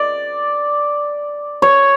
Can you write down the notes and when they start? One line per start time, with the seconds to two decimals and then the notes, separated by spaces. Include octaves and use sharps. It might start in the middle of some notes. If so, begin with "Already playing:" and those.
Already playing: D5
1.62 C#5